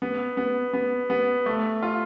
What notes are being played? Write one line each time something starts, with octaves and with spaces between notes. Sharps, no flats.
B3
B3
B3
B3
A3
F4